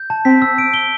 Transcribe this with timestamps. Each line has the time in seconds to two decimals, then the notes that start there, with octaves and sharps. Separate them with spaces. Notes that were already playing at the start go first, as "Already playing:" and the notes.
Already playing: G6
0.10 A5
0.25 C4 B6
0.42 E6
0.58 D7
0.74 G7